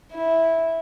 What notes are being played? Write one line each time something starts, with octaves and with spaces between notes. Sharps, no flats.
E4